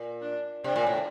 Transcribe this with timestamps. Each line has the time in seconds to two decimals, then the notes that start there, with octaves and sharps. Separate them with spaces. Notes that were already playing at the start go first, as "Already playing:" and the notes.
Already playing: A#2
0.22 D4
0.64 C3 D4
0.76 A#2
0.87 A2